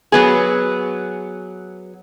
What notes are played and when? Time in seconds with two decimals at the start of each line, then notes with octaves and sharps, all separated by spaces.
0.12 F#3 B3 G#4